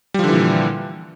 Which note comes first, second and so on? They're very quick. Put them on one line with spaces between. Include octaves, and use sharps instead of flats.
G3 F3 D3 E3 A#2